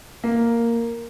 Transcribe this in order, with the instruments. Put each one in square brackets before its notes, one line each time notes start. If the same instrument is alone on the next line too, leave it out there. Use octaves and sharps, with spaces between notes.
[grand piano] A#3